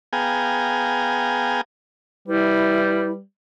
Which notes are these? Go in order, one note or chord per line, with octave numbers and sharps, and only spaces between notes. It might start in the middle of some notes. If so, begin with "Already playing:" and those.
B3 G#4 F5 G5 G#5 A#5
G3 E4 B4